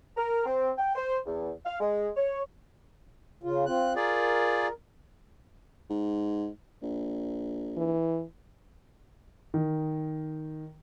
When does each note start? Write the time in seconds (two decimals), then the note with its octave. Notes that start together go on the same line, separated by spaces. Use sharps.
0.17 A#4
0.46 C4
0.78 G5
0.95 C5
1.26 E2
1.66 F5
1.80 G#3
2.17 C#5
3.43 C#3 F4
3.66 C4 F4 F#6
3.96 F4 G#4 A#4 D5
5.90 G#2
6.82 A#1
7.77 E3
9.54 D#3